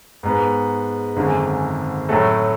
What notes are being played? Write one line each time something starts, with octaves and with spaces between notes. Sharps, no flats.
G#2 G#3 B3
G#1 F#2 D3 G#3
A2 F#3 A3